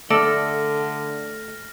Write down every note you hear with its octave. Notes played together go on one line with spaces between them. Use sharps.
D3 A3 A4 D5 F6 A#6